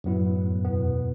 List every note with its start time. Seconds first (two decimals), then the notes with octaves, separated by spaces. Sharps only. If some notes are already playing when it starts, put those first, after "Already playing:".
0.04 F#2 A2 F#3 B3 E4
0.65 E2 B2 B3